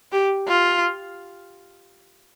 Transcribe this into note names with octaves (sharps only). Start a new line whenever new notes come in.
G4
F4